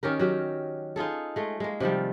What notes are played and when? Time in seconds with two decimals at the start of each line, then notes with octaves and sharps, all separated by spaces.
0.03 D#3 C#4 G4 A#4
0.19 F#3 G4
0.96 D#4 F4 G#4 A4
1.36 G#3 A3
1.60 G#3 A#3
1.80 C3 D#3 F3 G3